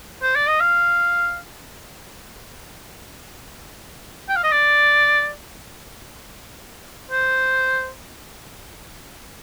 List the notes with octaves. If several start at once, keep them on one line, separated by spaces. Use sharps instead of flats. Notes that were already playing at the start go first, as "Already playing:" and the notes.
C5
D5
D#5
F5
G5
F5
D#5
D5
C5